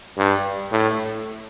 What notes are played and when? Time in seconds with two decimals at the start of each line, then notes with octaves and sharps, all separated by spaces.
0.18 G2
0.72 A2